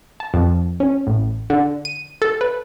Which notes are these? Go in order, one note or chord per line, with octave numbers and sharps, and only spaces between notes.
A5
F2
C#4
A1
D3
D#7
A4
B4